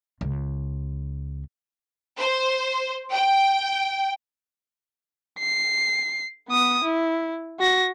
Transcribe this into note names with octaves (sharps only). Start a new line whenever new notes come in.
C#2
C5
G5
C7
B3 D#6
E4
F#4 A#6